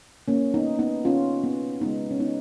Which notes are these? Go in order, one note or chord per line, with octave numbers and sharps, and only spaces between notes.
A#3 C#4
B3 D#4
B3 D#4
C#4 F4
B3
C#3 G#3 B3 D#4
C#4
B3 D#4